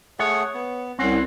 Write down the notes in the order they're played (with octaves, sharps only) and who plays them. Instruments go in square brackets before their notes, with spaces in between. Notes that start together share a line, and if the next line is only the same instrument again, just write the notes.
[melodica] A3 G#4 F#5 [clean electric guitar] C#5
[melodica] B3
[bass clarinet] C2 [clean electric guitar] C4 E4 [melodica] C#4 F#5